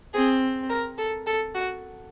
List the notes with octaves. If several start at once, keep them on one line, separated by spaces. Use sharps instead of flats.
C4 G#4
A#4
A4
A4
F#4